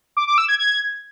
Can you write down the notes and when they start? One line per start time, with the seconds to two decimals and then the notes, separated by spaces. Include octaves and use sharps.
0.17 D6
0.27 D6
0.38 E6
0.48 G#6
0.59 G#6